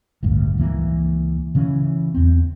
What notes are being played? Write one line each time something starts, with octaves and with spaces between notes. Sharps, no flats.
A1 D2 G2
C#2 E3 A#3
C#3 E3 C#4
E2 C4